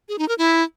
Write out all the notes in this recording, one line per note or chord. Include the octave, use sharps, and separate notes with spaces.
G#4
D#4
A#4
E4